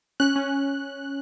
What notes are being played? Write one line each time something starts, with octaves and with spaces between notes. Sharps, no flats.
C#4 F#6
C#4